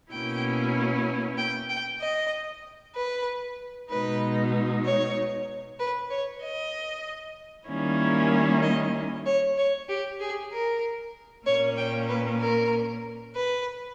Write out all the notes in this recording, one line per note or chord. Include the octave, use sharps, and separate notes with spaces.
B2 A#3 C#4 E4 G5
G5
G5
D#5
B4
B2 G#3 D#4 B4
C#5
B4
C#5
D#5
D#3 G3 A#3 C#4 E4
D#5
C#5
C#5
G4
G#4
A#4
A#2 A#3 C#4 C#5
G5
B4
A#4
B4